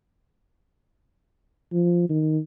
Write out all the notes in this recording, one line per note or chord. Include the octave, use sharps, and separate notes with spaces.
F3
D#3